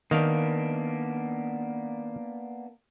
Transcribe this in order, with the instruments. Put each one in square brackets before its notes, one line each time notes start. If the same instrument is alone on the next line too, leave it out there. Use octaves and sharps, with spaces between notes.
[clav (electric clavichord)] D#3 F5 [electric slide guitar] A#3 B3 D4